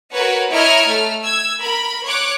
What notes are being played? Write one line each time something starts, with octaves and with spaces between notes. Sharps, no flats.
F#4 A#4 B4 C#5 F#5
E4 C#5 D#5 A#5 F6 D7
A3 F6
E6 G#6
A#4 B5
C#5 D6 F#6